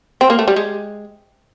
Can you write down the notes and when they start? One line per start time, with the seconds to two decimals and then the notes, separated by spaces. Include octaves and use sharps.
0.21 C4
0.30 A#3
0.39 A3
0.48 G3
0.56 G#3